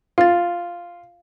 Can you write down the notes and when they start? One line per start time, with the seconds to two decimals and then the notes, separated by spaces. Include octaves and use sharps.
0.18 F4 F5 A6